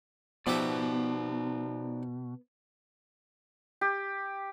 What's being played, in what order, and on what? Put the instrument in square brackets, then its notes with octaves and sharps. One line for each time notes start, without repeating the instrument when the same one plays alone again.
[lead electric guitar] B2 [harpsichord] F3 G4 E5 [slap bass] B3 [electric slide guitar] D#4 D5
[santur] G4